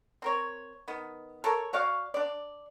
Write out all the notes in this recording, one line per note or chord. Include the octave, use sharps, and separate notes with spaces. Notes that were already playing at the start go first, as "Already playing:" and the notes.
C4 A#4 C#5
D#3 B3
A4 A#4 C#5
F#4 C#5 D5 F5
D4 D5